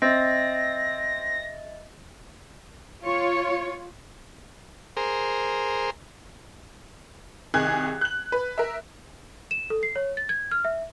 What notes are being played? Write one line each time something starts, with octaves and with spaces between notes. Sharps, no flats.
C4 D#5 E5 A6 A#6
F4 C#5
G#4 A#4 C5
C2 D#3 G#4 F#6 G#6
F#6 F#7
B4
A#4 E5
E7
A4
C7
C#5
A6
G#6
F6
E5